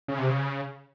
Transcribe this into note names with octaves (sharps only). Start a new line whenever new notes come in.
C#3
C3
C#3